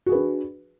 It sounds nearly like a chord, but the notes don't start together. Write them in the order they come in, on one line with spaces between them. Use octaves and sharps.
F#4 G#4 B4 D4